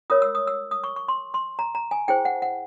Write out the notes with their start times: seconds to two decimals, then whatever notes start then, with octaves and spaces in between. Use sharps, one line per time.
0.10 F4 A#4 C#5 D#6
0.22 E6
0.35 D#6
0.47 E6
0.71 D#6
0.84 C#6
0.96 C#6
1.08 C6
1.34 C6
1.59 A#5
1.75 A#5
1.91 G#5
2.08 E4 G#4 C5 G5
2.25 F#5
2.42 F#5